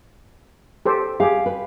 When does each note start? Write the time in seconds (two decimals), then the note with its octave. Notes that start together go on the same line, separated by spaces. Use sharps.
0.85 G4 A4 C5
1.20 G4 G#4 F5
1.46 B4